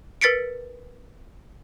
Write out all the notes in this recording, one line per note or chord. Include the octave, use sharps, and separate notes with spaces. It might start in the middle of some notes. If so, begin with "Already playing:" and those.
A#4 B4 A6 B6 C#7 D7